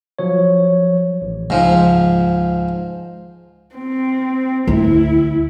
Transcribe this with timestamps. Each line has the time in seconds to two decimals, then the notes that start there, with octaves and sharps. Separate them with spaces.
0.19 F3 F#3 C#5
1.22 A1
1.50 C#2 G#2 F3
3.75 C4
4.68 D2 E4